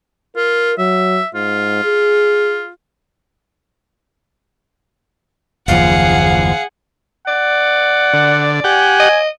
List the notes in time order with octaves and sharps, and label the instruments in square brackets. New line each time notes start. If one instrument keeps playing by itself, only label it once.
[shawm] F4 [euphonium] A#4
[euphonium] F#3 [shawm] E5
[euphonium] G#2 [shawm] F4
[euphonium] G#4
[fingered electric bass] F#1 D#2 F3 [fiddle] G#4 F#5 [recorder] F5
[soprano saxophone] D5 [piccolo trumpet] F#5
[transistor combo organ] D3
[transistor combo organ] G4 F#5 [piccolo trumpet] G#5
[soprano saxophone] D#5